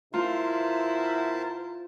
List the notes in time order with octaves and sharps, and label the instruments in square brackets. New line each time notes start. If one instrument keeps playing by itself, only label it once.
[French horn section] B2 E4 [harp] F4 [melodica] A#4 C5 A5